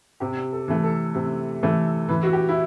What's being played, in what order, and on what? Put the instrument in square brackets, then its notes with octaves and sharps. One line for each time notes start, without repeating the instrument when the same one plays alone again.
[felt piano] C3 [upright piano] G4
[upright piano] A4
[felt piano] E3 A3
[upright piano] A4
[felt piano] C3
E3 A3
[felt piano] E3 [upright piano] B4
[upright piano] F#4
G4
E4